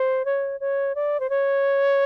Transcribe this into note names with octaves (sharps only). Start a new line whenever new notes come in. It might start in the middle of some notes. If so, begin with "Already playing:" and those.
Already playing: C5
C#5
C#5
D5
C5
C#5